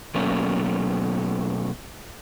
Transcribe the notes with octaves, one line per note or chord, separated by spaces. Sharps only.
B2 F#3 A3 A#3 C#4